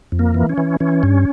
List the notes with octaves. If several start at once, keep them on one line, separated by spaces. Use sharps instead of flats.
F2
A#3
E3
C#4
E3
E3 C#4
G2